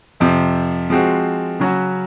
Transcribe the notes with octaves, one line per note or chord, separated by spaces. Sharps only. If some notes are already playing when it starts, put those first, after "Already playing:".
F2 C3 F3
F3 G#3 C4 F#4
C#3 F#3 C#4 F#4